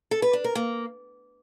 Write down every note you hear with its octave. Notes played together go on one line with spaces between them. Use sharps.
A4
B4
D4
A#4
A#3